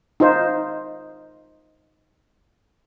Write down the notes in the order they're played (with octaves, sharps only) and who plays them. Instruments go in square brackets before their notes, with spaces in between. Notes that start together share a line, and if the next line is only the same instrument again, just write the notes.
[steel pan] D#4 F4 C5